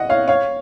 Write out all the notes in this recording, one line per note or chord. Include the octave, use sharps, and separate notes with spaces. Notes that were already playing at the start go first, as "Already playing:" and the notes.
Already playing: D#5 F#5
C#5 F5
C#5 F5